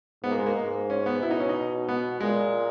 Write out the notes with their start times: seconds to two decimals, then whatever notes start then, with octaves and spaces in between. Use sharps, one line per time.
0.24 G#2 B3
0.31 A#3
0.39 G#3
0.46 A#3
0.56 G#2
0.90 C#4
1.06 B3
1.22 B2 E4
1.31 D#4
1.40 C#4
1.49 D#4
1.89 B3
2.21 A#2 G#3